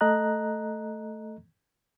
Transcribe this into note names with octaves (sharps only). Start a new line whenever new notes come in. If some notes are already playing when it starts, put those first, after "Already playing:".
A3 A4 D#5 A#5 F#6